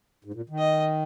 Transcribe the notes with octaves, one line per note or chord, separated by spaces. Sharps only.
G#2
A#2
D#3
D#5